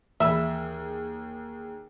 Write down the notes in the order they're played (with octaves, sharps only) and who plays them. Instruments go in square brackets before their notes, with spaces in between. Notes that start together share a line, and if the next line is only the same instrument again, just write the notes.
[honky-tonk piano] D#2 G#4 [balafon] E3 B5 [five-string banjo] E5